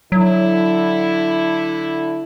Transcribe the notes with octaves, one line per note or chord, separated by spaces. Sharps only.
D3 F#3 E4